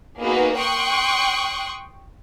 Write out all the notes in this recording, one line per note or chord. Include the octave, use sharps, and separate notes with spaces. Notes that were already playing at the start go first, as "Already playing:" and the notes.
A#3 B3 D#4 F#4 G#4 B4
G5 C6 C#6 D#6 F#6